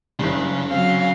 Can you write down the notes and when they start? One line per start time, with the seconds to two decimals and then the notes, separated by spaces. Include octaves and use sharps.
0.19 F#1 G2 C#3
0.71 F#3 C4 F5